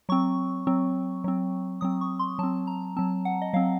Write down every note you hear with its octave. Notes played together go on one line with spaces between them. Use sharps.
F#3 C4 C#6
F#3 C4
F#3 C4
F#3 C4 D#6
C#6
C6
F#3 C4 A5
A#5
F#3 C4 A5
F#5
D#5
F#3 C4 F5